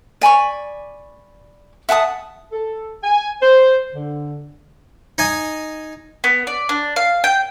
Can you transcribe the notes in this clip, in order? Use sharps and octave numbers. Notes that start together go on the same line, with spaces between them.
D5 G#5 B5 C#6
E5 F#5 A5 D#6
A4
G#5
C5
D3
D#4 D#5 G#5
B3
D5
D4
F5
G5